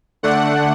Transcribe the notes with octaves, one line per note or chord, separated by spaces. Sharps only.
D3 A3 D4 F#5